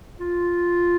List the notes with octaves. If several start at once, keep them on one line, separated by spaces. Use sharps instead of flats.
F4